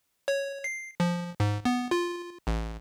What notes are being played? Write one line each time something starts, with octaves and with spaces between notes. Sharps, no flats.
C#5
C7
F3
G#2
B3
F4
A1